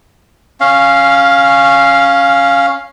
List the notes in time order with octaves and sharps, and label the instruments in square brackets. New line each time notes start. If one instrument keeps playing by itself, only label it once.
[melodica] C#4 F5